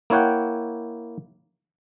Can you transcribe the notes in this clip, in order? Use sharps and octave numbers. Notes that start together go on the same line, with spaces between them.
A#3 E4 C#5 F#5 G5